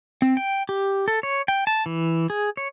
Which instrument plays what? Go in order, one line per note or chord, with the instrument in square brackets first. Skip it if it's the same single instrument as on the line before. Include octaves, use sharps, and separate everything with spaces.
[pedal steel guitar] C4
G5
G4
A4
C#5
G5
A5
E3
G#4
C#5